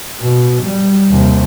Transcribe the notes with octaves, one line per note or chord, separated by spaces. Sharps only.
B2
G3
D#2 C3